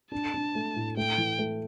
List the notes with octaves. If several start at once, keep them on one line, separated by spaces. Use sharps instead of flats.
D4 A5
D4
A3
A2
A3 G5
E3
A3